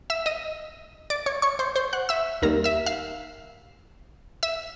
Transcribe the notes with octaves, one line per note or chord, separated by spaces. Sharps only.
E5 E6
D#5 D#6
D5 D6
C#5 C#6
C#5 C#6
C5 C6
C5 C6
F#5 F#6
E5 E6
D#2 D#3 G3 A#3 A#4 A#5
E5 E6
F5 F6
E5 E6